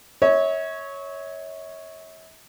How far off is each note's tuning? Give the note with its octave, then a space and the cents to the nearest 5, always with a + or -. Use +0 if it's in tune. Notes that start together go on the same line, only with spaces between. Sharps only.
C#5 +0 E5 -40